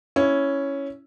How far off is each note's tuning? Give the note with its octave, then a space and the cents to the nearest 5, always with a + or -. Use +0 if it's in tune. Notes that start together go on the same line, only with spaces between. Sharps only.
C#4 +0 E4 +0